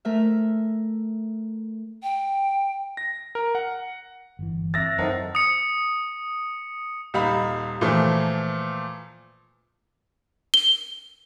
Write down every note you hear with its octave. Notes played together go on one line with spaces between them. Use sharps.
A3 A#4 E5
G5
A#6
A#4
F#5
G1 E3
C4 E5 E6 A6 A#6
F#2 A2 D#3 C5 F#5 A5
D#6 C#7
D#1 G3 D#4 F5 A#5 B5
A#2 E3 F3 A3
G7